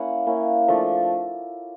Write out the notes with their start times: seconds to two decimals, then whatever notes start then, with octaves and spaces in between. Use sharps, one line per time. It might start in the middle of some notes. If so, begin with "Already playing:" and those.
Already playing: A#3 C#4 E4 F#5
0.27 A#3 C#4 E4
0.68 F3 A3 D4